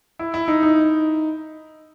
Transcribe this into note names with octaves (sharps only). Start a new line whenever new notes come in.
E4
E4
D#4
D#4